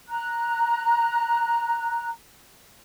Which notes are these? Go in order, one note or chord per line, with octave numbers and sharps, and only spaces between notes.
A#5 F#6